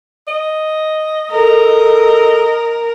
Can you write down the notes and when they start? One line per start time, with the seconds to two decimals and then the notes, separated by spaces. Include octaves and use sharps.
0.28 D#5
1.31 A4 A#4